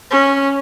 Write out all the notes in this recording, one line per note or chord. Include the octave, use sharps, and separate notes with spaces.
C#4